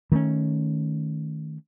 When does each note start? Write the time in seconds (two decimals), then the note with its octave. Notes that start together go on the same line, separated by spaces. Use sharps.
0.12 D#3 A3 B3 C#4